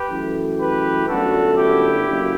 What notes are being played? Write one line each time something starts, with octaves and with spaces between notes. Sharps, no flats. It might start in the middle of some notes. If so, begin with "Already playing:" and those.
Already playing: G4 B4
F#2 E3 A3
G4 B4
G1 F#2 D3 A3 F#4 A4
E4 G4
F#1